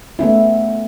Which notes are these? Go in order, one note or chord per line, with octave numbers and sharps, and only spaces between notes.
A3 B3 C#4 E4